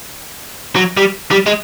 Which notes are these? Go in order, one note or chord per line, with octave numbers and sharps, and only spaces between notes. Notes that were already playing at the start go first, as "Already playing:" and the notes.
F#3
G3
G3
G#3